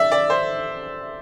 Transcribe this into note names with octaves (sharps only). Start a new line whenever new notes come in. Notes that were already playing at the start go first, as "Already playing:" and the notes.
Already playing: D5 E5
D5
C5